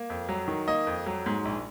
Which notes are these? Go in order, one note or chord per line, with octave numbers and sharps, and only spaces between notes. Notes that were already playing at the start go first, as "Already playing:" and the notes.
Already playing: A#3
F2
F#3
D#3
A#3 D#5
F2
F#3
G#2
A#1